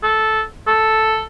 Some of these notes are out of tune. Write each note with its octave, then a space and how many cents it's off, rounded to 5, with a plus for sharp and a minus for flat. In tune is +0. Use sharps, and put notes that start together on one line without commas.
A4 -10
A4 +0